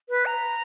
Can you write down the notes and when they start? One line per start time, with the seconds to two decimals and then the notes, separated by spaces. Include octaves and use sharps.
0.09 B4
0.26 A#5